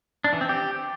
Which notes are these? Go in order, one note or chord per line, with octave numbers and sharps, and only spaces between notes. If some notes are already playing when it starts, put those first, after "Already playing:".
D4
E3
C4
G4